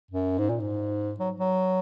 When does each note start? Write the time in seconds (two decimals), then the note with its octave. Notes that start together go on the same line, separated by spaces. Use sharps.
0.11 F#2
0.38 G#2
0.49 A#2
0.60 G#2
1.20 F#3
1.40 F#3